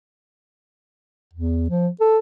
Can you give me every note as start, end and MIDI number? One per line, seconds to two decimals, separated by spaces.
1.34 1.67 40
1.70 1.89 53
2.01 2.18 69